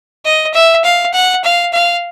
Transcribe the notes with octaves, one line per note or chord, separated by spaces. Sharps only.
D#5
E5
F5
F#5
F5
F5